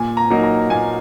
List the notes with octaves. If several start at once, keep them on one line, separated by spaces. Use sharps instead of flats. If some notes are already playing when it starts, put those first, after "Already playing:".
Already playing: A#2 G#5
A#5
F#3 A#3 D#4 A#4
A#5
A#2 G#5